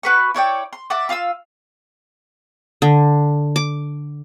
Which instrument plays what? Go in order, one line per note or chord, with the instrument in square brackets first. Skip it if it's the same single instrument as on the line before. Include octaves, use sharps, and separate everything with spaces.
[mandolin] F#4 B4 C#6
E4 C#5 D5 G5
C6
D5 E5 F#5 D6
F4 F5 D#6 E6
[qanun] D3
D6